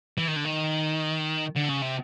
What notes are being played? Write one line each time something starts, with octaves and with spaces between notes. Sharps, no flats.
E3
D#3
D3
D#3
D3
C#3
C3